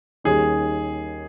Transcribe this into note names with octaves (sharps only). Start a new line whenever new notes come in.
D#2 D#3 G3 C#4 G#4